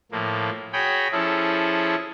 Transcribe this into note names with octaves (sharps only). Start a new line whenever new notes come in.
A2 F3 A#3
F#4 G#4 C#5 G5 B5
F3 C#4 E4 G#4 A4